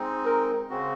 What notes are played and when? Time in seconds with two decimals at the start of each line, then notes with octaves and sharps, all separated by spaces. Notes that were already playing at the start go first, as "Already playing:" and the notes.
Already playing: G#3 C4 D#4
0.25 A#4
0.69 C#3 G#3 C4 F#4